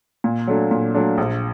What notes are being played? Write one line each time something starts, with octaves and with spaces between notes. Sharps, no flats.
A#2
F#3 A3 D4
A#2
F#3 A3 D4
A#1